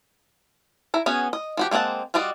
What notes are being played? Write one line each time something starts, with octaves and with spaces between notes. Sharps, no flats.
E4 A#5
B3 C#4 F#4 G#4
D#5
F3 F#4 G4
G#3 A#3 C4 F#5 A5
G3 F4 F#4 D5 D#5